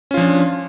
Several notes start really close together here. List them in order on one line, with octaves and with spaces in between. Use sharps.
C#4 F4 F3 D4